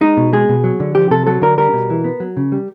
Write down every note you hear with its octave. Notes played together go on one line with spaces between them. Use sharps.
G#3 D#4
B2
G#3 G#4
B2
F#3
D3
F3 G4
C3 A4
F#3 A4
D3 A#4
G3 A#4
B2
E3
B3
F#3
C#3
G3